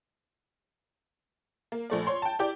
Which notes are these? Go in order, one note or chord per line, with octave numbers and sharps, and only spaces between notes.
A#3
A#1 A3 D5
C#5 C6
G5 A5
E4 G4 D5 G5 D6